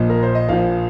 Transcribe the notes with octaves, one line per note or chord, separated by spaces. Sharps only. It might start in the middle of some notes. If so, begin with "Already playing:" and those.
Already playing: A#1 A#2 F3 D#5
A#4
C5
D#5
A#1 A#2 F3 F5